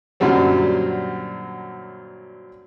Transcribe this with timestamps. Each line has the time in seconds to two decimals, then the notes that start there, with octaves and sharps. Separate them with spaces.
0.20 F#2 A#2 D3 F#3 G3 C4